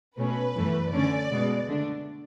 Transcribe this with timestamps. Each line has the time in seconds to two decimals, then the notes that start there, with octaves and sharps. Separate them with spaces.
0.17 B2 A3 C#4 B4
0.55 F#2 E3 A3
0.92 D3 A3 C#4 D5
1.31 B2 G#3 B3
1.68 D3 A3 D4